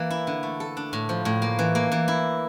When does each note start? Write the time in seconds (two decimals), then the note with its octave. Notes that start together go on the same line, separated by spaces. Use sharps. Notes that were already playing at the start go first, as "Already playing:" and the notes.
Already playing: E3 A#3
0.10 E4
0.27 D3
0.43 A3
0.60 A4
0.77 D4
0.93 A2
1.09 F3
1.25 A2
1.42 A#3
1.59 E3
1.75 A#3
1.92 E3
2.08 E4